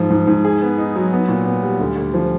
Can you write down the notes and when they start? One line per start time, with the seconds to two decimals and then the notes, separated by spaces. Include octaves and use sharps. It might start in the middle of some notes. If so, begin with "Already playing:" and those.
Already playing: G#2 F3
0.10 G#2
0.27 G#2
0.45 G#4
0.62 B3
0.78 D#4
0.96 F#3
1.13 B3
1.29 A#2
1.45 B3
1.63 G3
1.80 D2
1.96 D2
2.14 F3